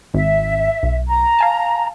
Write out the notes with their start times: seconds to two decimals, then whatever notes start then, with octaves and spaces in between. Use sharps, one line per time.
0.14 G#1 E5
0.83 B1
1.08 A#5
1.39 F5 G#5 A5